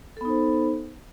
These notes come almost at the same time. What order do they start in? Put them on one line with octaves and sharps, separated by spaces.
A4 B3 D#4 C5